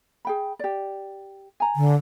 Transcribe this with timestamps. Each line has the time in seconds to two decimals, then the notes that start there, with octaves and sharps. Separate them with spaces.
0.25 G#4 G5 B5
0.59 G4 D5
1.60 G#5 A#5
1.76 D3